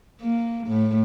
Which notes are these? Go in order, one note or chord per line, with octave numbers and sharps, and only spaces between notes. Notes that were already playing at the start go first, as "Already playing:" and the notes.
A#3
A2